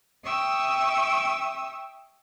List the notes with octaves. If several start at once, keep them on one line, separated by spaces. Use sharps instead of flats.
E5 G5 C#6 D#6 E6